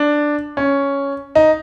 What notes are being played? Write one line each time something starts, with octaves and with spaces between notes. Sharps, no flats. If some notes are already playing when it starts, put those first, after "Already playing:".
Already playing: D4
C#4
D#4